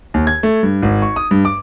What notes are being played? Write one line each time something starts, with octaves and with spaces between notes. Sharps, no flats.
D#2
G#6
A3
G2
G#1
C#6
D#6
G2
D6